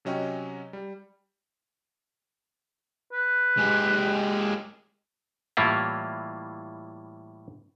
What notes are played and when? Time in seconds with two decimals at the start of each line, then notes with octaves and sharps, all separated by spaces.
0.05 C3 F#3 C#4 D#5 G5 C#6
0.73 G3
3.12 B4
3.57 G#3 G4
5.57 A2 E3 G3 A#3 E4 F4